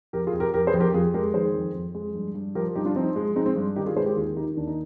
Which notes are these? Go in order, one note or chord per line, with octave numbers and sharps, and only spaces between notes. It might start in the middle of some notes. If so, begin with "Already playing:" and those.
F2 G4 A#4
F4 G#4
F2
G4 A#4
F2 G4 A#4
G#4 C5
F2
G4 A#4
F2 F4 G#4
G#3 G4 A#4
D#3 G#4 C5
F2
F2
G#3
G2
G2
F3 G4 A#4
G2 D#4 G4
D4 F4
F3 C4 D#4
G#3
G#3 C4 D#4
C4
G2
D#3 D#4 G4
F4 G#4
G#3 G#4 C5
G4 A#4
D#2 F4 G#4
D#3 D#4 G4
D#2 D4
D#4